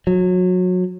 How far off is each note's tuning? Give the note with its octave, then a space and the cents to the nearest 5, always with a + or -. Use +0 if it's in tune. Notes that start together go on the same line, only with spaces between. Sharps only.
F#3 -25